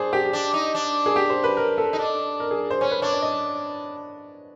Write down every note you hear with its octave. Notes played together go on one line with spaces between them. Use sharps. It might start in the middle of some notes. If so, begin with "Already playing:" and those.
Already playing: D4 G#4 C5
G4
D4
D#4
D4
G#4
G4
C5
B4
A#4
A4
D#4
D4
A#4
G#4
C5
C#4 C#5
B4
D4 C#5
D5
D#5